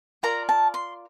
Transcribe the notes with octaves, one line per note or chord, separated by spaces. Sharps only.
F4 A#4 D5 A#5
A5
C6